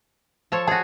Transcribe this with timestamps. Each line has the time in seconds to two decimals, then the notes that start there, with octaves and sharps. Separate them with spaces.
0.52 F3 A4 C#5
0.67 F#4 G#4 D#5 A5